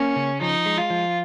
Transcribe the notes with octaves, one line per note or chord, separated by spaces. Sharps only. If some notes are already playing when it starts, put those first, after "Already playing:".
Already playing: A#3 C#4
C#3
F3 D#4
G#3
F4
F3